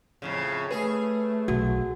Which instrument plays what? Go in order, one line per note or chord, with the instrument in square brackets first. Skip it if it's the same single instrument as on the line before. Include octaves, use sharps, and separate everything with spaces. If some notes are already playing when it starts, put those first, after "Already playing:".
[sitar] F2 A2 C#3
[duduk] A3 [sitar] G#4 [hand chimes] B4
[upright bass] B1 [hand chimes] F#4